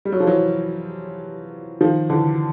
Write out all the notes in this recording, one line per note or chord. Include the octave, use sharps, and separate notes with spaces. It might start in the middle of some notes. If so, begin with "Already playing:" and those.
G3
F#3
F3
E3 F#3
D#3 F3
D3 E3